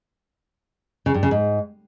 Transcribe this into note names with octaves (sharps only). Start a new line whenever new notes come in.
C#3
G2
C#3
G#2